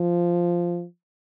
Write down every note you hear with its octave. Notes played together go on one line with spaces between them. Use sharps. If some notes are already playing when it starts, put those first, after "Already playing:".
Already playing: F3